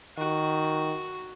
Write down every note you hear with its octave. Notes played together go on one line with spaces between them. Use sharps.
D#3 F#4